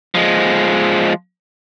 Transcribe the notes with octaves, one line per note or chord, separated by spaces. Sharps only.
F3 G#3